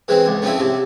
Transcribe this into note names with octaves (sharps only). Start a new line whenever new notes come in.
E3 G#3 C4
C#2
C#3 F3 C4 E4
C3